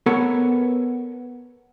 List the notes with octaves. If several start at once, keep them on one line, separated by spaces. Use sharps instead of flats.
B3 A4 A#4 C#5